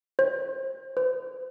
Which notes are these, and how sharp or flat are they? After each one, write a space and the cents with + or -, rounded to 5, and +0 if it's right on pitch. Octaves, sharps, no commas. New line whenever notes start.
C5 +30
C5 -45